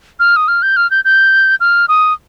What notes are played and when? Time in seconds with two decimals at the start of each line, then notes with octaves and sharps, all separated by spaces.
0.20 F6
0.36 D#6
0.48 F6
0.62 G6
0.76 F6
0.91 G6
1.05 G6
1.60 F6
1.88 D#6